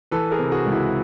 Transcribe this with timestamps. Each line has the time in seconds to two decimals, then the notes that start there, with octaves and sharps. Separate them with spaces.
0.11 E3 A4 B4
0.31 G#4 A#4
0.39 C3
0.52 F#4 G#4
0.66 C#2
0.72 E4 F#4